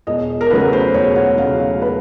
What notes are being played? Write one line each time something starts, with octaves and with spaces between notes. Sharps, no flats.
E1 D#5
A#4
D2 C#3 F#3 B4
C5
E1 C#5
F#5
D2 C#3 F#3 F5
F5
B4